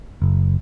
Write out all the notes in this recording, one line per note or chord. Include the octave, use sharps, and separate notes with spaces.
F#1